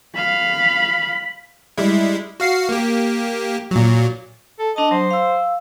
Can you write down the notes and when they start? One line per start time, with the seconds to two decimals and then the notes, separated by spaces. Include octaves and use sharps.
0.16 F5 B5
1.78 G3 G#3 E4
2.40 F#4 F5 C7
2.69 A#3 G4
3.71 A#2 F#3
4.59 A4
4.76 D4 D#5 A5
4.91 F#3 C5
5.11 F5 E6